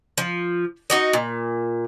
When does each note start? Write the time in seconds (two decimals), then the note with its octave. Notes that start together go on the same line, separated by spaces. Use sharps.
0.18 F3
0.90 D#4 F#4 D#5
1.13 A#2